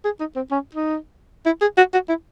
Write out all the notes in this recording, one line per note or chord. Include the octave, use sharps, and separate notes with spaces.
G#4
D#4
C4
C#4
D#4
E4
G#4
F#4
F#4
E4